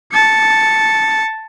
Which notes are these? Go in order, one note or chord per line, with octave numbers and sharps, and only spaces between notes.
A5 C#7